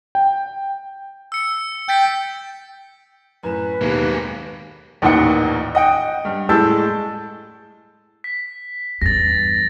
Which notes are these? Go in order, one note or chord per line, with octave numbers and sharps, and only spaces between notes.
G5
E6 C#7
G5 G6 A6 B6
F#2 A2 B4 E7
D#2 B2 G#3 A#3
A1 D#2 A#2 D#4 F#5 C#7
D#5 F#5 G5
G2
A2 G#3 A5 E6 G6 A6
B6
E2 G2 A6 A#6